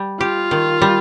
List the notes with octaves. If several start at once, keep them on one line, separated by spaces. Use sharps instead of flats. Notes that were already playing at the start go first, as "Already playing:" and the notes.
Already playing: G3
F4 G4
D#3
G3